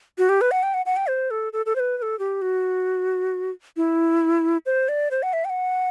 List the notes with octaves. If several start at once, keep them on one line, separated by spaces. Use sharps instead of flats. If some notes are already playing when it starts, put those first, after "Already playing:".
F#4
G4
B4
F#5
G5
F#5
F#5
G5
C5
A4
A4
A4
C5
B4
B4
A4
G4
F#4
E4
C5
D5
C5
F#5
E5
G5
F#5